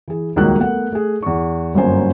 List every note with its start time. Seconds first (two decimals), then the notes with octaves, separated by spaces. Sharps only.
0.08 E3 G#4
0.36 D#1 C#2 D#3 A#3 F#4 F#6
0.57 A3 B3 A#4 F#5
0.92 A3 G#4
1.23 E2 C#6
1.74 G1 F#2 A#3 C#4 C5 G#5